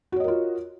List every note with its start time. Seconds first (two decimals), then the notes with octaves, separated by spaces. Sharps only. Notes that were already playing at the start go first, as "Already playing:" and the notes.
0.12 F#4
0.16 C#5
0.20 D#5
0.24 A#4
0.28 F4